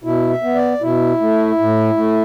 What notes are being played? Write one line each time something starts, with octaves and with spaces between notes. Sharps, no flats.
B2 E4
E5
B3
D5
B2 E4
A3
A2
A3